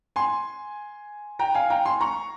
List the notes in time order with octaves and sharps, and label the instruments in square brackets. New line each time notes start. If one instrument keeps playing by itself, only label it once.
[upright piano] G#5 C6
G5 A#5
F5 G#5
G5 A#5
G#5 C6
A#5 C#6